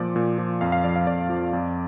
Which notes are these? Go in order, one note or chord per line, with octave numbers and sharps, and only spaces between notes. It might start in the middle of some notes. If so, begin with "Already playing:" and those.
Already playing: A#2 F3 D5
A#2
F3
F2 F5
F5
F3 D5
F5
F2 D5
F3
F2